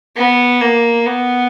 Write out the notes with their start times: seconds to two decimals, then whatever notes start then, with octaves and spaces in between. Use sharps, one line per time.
0.16 B3
0.61 A#3
1.06 B3